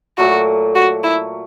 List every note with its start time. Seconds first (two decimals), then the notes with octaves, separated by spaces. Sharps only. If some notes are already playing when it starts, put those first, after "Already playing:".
0.18 A#2 F#3 A3 F#4
0.75 F#4
1.03 E4